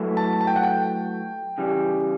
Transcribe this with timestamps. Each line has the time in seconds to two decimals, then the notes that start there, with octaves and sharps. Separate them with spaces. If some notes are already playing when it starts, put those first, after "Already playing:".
Already playing: F#3 A3 E4 B4
0.17 A5
0.41 A5
0.47 G5
0.56 F#5
0.63 G5
1.58 C#3 E3 G3